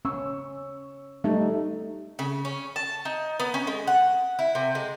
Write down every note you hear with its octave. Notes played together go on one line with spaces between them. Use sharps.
C#4 C#6 E6
G3 A3 D#4 G4
C#3
C#4
A5
D#4
B3
C#4
G#3
F#5
E4
C3
G#3